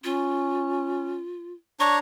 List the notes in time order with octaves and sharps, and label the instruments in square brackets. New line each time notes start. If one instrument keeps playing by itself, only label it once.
[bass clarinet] C#4 [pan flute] F4
[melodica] D4 C#5 A#5 [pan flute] C#6